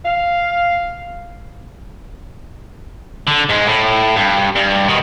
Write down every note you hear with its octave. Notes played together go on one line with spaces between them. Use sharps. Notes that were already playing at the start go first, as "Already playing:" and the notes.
F5
D3
G#2 G#3
A2
G2
G2
B2 D#3